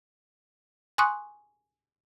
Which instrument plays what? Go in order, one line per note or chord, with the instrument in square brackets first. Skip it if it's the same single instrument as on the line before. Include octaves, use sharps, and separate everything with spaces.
[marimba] G#5 C6 C#6 D#6 F#6